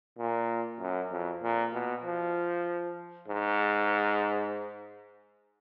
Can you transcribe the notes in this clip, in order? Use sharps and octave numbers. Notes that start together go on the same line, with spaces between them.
A#2
F#2
F2
A#2
B2
F3
G#2